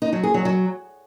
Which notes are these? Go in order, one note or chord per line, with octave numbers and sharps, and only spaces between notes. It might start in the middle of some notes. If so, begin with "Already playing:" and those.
D#4
F#3
G#4
F#3
F#3